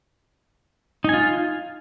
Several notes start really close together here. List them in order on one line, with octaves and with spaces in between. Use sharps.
D#4 G#5 F4